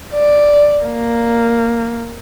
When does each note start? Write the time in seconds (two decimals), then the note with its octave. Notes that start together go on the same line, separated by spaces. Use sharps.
0.14 D5
0.85 A#3